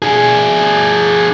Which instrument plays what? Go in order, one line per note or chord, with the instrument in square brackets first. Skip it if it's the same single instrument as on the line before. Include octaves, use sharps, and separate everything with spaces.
[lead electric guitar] D4 G#4